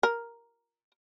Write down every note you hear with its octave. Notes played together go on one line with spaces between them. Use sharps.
A#4